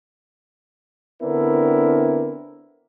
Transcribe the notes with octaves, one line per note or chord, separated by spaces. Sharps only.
D3 B3 C4 D4 E4 A#4